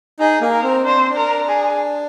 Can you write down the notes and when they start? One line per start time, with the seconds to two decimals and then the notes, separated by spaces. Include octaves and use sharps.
0.20 D#4 G#4
0.41 A#3
0.52 A#4
0.63 C4
0.84 D4 C5
0.96 C4
1.09 D4
1.17 A#4
1.49 G#4